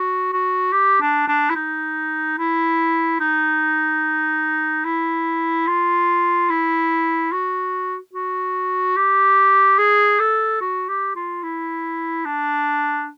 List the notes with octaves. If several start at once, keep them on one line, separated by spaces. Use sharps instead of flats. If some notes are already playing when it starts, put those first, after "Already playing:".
Already playing: F#4
F#4
G4
D4
D4
E4
D#4
E4
D#4
E4
F4
E4
F#4
F#4
G4
G#4
A4
F#4
G4
F4
E4
D4